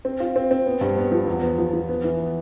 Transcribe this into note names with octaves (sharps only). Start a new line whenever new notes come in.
C4
F4
C4
C4
B3
G2
B3
F3
E2
B3
F3
F3
B3
E3
B3